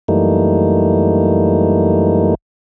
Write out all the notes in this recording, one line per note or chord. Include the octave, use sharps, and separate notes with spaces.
F#2 E3 G3 A3 A#3 D#4